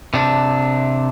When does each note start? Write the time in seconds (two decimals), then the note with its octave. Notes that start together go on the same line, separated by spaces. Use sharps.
0.14 C3 D4